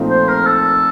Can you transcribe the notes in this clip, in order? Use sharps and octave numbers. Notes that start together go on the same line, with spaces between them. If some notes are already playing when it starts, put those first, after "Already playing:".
Already playing: A#2 F3 A3 C4 D#4
C5
A#4
A4